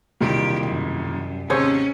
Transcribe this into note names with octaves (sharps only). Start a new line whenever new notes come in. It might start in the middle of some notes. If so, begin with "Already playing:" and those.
E1 C2 A#2 D#3 G4
F#2
D#2 G#2 C3 C#4 G#4 C5 C#5